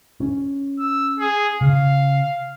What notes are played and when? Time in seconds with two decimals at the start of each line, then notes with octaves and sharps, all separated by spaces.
0.20 C#4
0.80 E6
1.20 G#4
1.61 C#3 F5